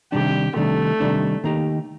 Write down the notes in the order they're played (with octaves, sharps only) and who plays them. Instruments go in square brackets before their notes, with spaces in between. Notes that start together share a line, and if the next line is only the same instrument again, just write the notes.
[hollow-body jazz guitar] C3 D#3 G3 D4 [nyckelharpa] G4
[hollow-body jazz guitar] C3 D#3 G3 D4 [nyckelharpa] A3
[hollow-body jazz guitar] C3 D#3 G3 D4
D#3 A#3 D#4 G4